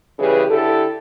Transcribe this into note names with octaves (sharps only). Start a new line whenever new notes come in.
C#3 E3 G3 G4 G#4 B4
D3 E4 G4 A4